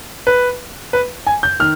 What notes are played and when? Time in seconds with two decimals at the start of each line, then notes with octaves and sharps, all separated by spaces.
0.27 B4
0.93 B4
1.27 G#5
1.43 G6
1.60 D#3 F6